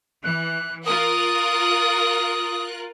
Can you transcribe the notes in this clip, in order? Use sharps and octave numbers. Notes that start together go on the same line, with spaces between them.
E3 F#6
F4 A#4 D#6 F#6